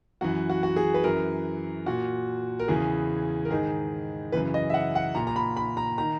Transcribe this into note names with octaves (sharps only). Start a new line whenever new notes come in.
F#2 E3 F#4
F#4
F#4
G#4
B4
F#2 E3 A#4
A#2 F#4
A#4
E2 C#3 E3 G#4
A#4
G#2 D#3 G#4
F#2 C#3 E3 B4
D#5
E5
F#5
F#5
A#2 A#5
A#5
B5
B5
A#5
D#3 A#5